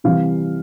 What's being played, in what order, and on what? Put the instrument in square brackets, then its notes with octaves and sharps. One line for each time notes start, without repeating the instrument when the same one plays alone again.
[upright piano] C3 E3 G3 F5